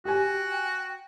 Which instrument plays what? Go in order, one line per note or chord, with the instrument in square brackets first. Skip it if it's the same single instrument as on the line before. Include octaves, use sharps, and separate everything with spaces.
[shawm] F#4 [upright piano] G4 G#5 [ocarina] G5